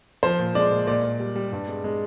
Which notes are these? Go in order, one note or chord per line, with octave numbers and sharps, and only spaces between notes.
F3 C5
A#2
G#3 D5
A#2
A#2 D5
A#2
G3
G3
G2
G#3
G#3